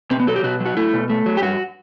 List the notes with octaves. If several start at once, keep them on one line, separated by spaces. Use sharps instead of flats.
B2 C4
B3
F#3 A4
G4
B2 F#4
F#3
F#4
A3 E4
B2
A3
F#3
G4
G2 F#4